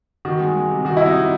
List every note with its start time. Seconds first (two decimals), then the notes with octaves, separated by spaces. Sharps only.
0.25 D#3 F#4
0.40 G#3
0.56 G#3
0.71 C3
0.85 D#3 F#4
0.97 C3 E4
1.06 D#4
1.16 C3